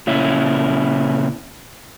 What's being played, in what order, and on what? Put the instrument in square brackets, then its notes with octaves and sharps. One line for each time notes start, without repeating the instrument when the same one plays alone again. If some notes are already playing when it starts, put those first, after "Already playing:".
[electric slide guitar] A#2 C#3 C#4 E4